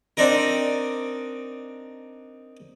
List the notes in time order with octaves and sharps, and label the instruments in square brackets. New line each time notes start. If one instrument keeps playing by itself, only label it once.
[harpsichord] C4 D4 D#4 A#4